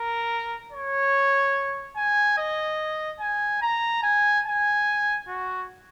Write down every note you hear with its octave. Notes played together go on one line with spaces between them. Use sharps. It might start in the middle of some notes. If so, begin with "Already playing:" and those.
Already playing: A#4
C#5
G#5
D#5
G#5
A#5
G#5
G#5
F#4